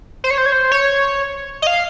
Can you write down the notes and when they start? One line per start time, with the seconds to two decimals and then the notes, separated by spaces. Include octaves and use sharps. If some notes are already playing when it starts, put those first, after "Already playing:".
0.24 C5
0.31 C#5
0.38 C5
0.46 C#5
0.52 C5
0.72 C#5
1.62 D#5
1.67 F5